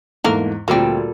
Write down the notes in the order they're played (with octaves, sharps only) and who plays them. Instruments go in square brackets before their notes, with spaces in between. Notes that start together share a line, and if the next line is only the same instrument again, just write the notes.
[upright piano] E2 G#2 [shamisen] A3 A#3 A#4
[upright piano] D2 [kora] A#2 G3 A4 [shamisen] A#3 C4